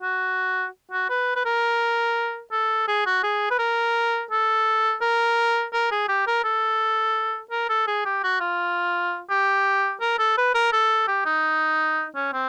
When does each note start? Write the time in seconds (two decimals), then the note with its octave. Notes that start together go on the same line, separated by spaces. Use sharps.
0.02 F#4
0.91 F#4
1.09 B4
1.35 B4
1.45 A#4
2.52 A4
2.88 G#4
3.06 F#4
3.23 G#4
3.51 B4
3.59 A#4
4.31 A4
5.01 A#4
5.73 A#4
5.91 G#4
6.09 G4
6.27 A#4
6.44 A4
7.51 A#4
7.69 A4
7.87 G#4
8.05 G4
8.23 F#4
8.40 F4
9.30 G4
10.01 A#4
10.18 A4
10.37 B4
10.54 A#4
10.73 A4
11.08 G4
11.26 D#4
12.15 C#4
12.33 C4